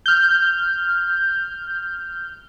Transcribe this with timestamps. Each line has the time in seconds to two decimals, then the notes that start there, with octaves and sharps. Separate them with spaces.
0.06 F6 G6